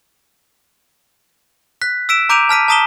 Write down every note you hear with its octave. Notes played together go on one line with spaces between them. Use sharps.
F#6 B6
E6 B6 D7 E7
A#5 D6 G6 D7 D#7 F7
A5 F6 B6 D#7
A5 A#5 D#6 B6 E7 G7